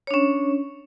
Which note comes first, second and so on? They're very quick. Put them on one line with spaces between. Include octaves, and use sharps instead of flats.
C#5 D4 C#4